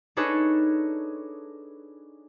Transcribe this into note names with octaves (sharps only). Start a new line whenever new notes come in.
D4 D#4 G#4 A4 B4 C#5